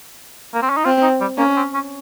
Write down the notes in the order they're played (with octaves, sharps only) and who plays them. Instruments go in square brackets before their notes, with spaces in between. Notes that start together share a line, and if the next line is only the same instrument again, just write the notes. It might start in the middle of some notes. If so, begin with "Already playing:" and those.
[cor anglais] A#3
C4
C#4
D#4
[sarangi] C4 [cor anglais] F4
[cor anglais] D#4
G3
[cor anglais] A#3 [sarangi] C#4
[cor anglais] C4
C#4